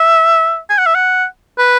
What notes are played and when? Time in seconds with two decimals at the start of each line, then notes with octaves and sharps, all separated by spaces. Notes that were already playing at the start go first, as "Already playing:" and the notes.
Already playing: E5
0.70 G#5
0.78 F#5
0.86 E5
0.95 F#5
1.58 B4